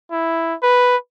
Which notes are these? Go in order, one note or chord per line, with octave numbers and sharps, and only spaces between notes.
E4
B4